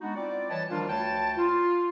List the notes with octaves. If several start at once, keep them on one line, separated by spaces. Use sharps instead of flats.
G#3 B3 D4 D#4 F#4
C4 E4 F4 D5
E3 G3 B4 C#5 D#5 A5
D#3 F3 G3 D4 F4
D2 B4 C#5 G5 A5
F4